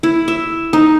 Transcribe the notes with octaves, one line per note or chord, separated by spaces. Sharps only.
E4
E5
D#4